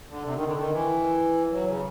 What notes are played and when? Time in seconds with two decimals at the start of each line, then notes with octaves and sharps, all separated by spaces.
0.09 D3
0.25 C3
0.35 D#3
0.46 D3
0.56 D#3
0.72 E3
1.51 F#3
1.67 C#3